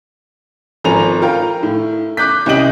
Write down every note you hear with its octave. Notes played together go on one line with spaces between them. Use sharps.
G#1 F3 A4 G#5 A#5 F7
F4 A#4 G5
A2
D6 F#6 G6 B6
C2 C#4 G4 D#5 D7 F#7